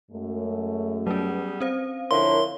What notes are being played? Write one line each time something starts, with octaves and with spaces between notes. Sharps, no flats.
F#2 G#3 A3
F#3 G3 B3 C#4 G#4
C4 C5 F5
D3 F3 E4 A#4 C#5 F5 C6